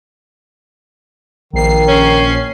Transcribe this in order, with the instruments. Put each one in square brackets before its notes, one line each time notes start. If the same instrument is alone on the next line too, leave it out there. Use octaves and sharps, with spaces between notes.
[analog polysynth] A#1 C7 [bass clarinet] D#3
[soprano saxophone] C#4